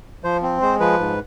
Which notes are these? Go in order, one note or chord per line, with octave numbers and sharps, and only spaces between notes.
F3 C5
C4
G#3 C5
F3 B4
G#2